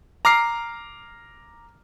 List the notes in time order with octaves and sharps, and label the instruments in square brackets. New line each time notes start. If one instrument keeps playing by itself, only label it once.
[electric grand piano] A#5 D6 F6 C7